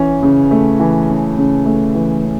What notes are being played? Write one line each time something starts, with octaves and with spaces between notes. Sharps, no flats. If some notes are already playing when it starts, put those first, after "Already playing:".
Already playing: E3 C#4
C#3
A3
E3
C#4
C#3
A3
E3
C#4